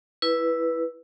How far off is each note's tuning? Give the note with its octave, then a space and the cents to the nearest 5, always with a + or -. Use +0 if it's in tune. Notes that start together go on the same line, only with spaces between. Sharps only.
E4 +5 B4 -10